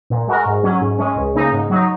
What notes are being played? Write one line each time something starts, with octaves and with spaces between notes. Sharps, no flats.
A#2
G#3 F#4 A#4
G#2
F#3 C#4
G#2
G#3 C#4
C#2
C#3 A#3 D#4
G#2
F#3 D#4